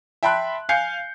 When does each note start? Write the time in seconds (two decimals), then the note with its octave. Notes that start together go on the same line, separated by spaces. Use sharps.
0.23 E5 G5 A5 B5 C6 F#6
0.69 F5 G#5 G6 C7 C#7